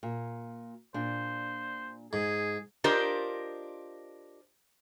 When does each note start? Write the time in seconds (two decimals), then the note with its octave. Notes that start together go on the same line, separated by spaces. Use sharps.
0.03 A#2
0.94 A#2 D4 C5
2.13 G#2 G#4
2.84 D4 F4 G4 A#4 C5 D#5